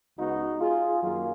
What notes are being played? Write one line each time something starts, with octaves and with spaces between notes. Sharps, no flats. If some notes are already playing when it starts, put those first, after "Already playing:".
C#2 C#3 G#3 B3 D#4 F#4
F4 G#4
F#2 D#3 F#3 A#3 F4 G#4